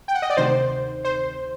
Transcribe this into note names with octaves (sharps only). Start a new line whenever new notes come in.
G5
F#5
D#5
D5
D2 C3 D#3 C5
C5